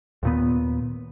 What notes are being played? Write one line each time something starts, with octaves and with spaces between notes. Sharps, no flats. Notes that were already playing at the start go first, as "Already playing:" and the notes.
D#2 A#2 B3